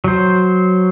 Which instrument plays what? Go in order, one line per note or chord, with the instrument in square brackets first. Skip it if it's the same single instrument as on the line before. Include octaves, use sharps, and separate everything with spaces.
[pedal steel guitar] F#3 C5